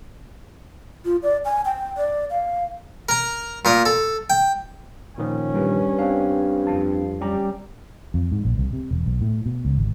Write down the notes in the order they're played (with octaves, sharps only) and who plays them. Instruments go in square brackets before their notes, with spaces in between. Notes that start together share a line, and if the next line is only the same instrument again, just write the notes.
[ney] F4
D5
G#5
G5
D5
F5
[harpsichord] A#4 A#5
A#2 A#4 D#6
A4
G5
[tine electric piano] A#2 D#3 F3 [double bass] C#4
[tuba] G2 [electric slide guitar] G3 A#4 B4
[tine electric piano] C4 D4 F5
[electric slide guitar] F2 F4 A5
[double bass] G3 [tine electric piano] C#4 G4 A#5
[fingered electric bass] F2
G#2
A#1
C2
C3
E1
B1
A2
B2
C#2
G#1